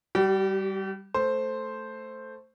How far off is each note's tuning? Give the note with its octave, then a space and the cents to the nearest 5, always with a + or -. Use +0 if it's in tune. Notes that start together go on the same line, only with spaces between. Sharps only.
G3 +0 G4 -40
A3 +0 C5 +0